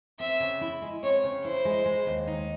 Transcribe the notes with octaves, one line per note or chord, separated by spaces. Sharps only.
C4 E5
C#3
E4
G#3
C4 C#5
C#3
E4 C5
G#3
G#3
D#2
D#4